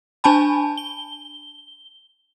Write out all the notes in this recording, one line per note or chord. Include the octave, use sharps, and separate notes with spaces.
D4 G#5 A5 B5
G7